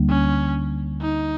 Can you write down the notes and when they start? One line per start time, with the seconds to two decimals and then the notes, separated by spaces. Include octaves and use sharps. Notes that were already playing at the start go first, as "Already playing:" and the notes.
Already playing: D2 D3 G3 A#3
0.09 C#4
1.01 D#4